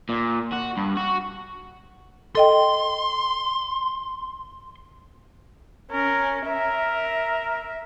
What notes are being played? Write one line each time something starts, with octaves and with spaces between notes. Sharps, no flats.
A#2
F#4
G2
F#4
A4 D#5 G5 C6
C#4 A#4
A#4 E5